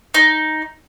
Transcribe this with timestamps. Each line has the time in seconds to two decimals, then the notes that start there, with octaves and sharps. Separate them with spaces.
0.14 D#4